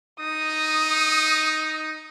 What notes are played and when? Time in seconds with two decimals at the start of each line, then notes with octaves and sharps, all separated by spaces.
0.20 D#4 D#6